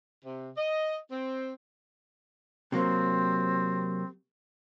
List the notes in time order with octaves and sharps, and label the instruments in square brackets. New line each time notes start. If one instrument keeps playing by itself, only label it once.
[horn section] C3
D#5
C4
[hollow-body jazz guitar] C3 F#3 A#3 [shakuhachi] C4